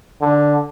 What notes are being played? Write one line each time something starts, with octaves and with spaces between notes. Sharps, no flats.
D3